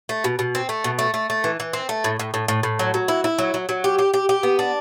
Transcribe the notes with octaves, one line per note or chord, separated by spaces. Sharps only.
A3
B2
B2
C4
A3
B2
A3
A3
A3
E3
E3
C4
A3
A2
A2
A2
A2
A2
F#3
F#3
E4
E4
F#3
F#3
F#3
G4
G4
G4
G4
B3
D4